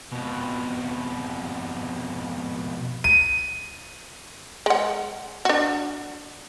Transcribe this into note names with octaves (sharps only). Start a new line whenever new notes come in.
F2 B2
D#7
G#3 F#5
D4 F#4